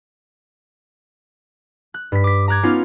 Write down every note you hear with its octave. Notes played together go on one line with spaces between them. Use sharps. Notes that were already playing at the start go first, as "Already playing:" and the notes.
F#6
G2 B6
D6 B6
A#5 D6 F#6 G#6
B3 C#4 D#4 F4